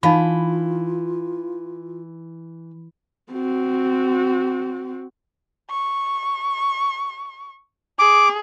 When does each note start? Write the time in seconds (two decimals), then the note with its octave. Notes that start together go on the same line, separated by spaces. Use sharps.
0.03 E3 D#4 F4 F5 B5
3.32 C4 F#4
5.70 C#6
7.99 G#4 D6